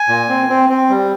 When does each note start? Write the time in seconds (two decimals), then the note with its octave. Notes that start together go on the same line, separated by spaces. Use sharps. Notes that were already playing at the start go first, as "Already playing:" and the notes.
Already playing: G#5
0.08 A#2
0.29 C4
0.49 C4
0.69 C4
0.90 G3